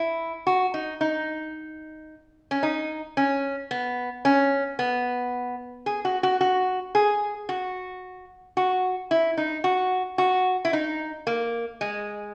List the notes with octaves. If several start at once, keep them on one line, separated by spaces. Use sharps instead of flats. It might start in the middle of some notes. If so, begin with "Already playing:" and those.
Already playing: E4
F#4
D#4
D#4
C#4
D#4
C#4
B3
C#4
B3
G#4
F#4
F#4
F#4
G#4
F#4
F#4
E4
D#4
F#4
F#4
E4
D#4
A#3
G#3